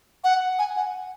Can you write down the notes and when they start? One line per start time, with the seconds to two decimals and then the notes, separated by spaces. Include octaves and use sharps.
0.24 F#5
0.59 G#5
0.76 F#5